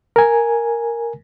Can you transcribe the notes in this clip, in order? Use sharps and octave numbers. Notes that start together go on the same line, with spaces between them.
A#4 G#5